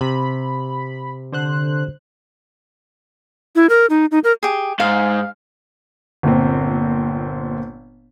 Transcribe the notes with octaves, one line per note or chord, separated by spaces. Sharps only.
C3 B5
D3 C5 F#6
E4
A#4
D#4
D#4
A#4
G4 G#4
G#2 F5
G1 A#2 C4